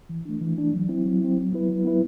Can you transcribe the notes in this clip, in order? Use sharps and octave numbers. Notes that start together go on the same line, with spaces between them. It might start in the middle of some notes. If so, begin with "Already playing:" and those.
E3
A3 D4
E3
A3 D4
F#3
C4 E4
F#3
C4 E4
F#3
B3 E4 B4
F#3
B3 E4 B4